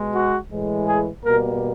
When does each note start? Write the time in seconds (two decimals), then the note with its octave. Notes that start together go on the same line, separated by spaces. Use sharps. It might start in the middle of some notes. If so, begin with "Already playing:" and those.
Already playing: B2 G#3
0.14 F#4
0.50 A2 E3 G#3
0.87 G#4
1.24 B2 G3 A#3 A#4